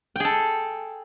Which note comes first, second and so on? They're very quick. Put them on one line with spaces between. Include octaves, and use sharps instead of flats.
G5 G#4 A4